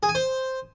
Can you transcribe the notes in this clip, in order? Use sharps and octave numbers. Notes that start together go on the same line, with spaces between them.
G#4
G#5
C5